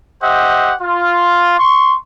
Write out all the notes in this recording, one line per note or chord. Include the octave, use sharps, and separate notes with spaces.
G4 C5 D#5 E5 F#5
F4
C6 C#6